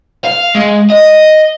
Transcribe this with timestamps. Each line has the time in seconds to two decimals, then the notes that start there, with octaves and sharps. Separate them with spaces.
0.24 F5
0.55 G#3
0.90 D#5